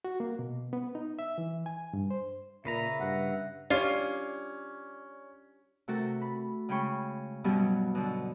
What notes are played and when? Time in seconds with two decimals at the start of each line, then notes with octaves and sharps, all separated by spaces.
0.05 F#4
0.20 A#3
0.39 B2
0.73 B3
0.95 D#4
1.19 E5
1.38 E3
1.66 G#5
1.93 G2
2.10 C5
2.65 A#2 C#3 B4 E5 A#5
3.00 G2 F#5
3.70 C#4 D4 F4 G4 C#5 D5
5.88 C3 A3 F#4 A4 A#4
6.21 B5
6.69 C#3 G#3 G5 B5 C#6
7.44 G2 B2 F#3 G3 B3 C#4
7.95 B2 D3